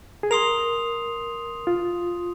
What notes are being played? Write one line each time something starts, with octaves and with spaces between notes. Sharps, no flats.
G#4
A#4 C6 D#6 C7 F7
F4